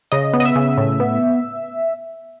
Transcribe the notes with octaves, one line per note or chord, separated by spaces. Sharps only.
C#3 D#5
B3
D#5
E5
C#3
A2
B3